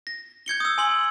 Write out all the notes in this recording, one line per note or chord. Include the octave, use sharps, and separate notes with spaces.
A#6
G6 G#6 C#7 G7
D#6 E6
G#5 C6 F#7